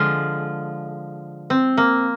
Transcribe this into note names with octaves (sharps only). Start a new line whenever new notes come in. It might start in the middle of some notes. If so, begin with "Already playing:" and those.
Already playing: D3 F3 G#3 F4
C4
A#3